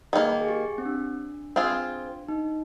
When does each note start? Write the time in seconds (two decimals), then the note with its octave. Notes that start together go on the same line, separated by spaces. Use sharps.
0.13 D#3 G3 A#3 G#4
0.41 G#4
0.48 G4
0.78 C4
0.85 D4
1.56 C4 F4 G#4
2.28 D#4